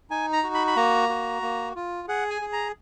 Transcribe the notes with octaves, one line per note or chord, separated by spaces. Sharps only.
D#4 G#5
A#5
F#4
B5
B5
A#3 A#5
F#4
A#3
F4
G#4 F#5
G#5
G#4
A#5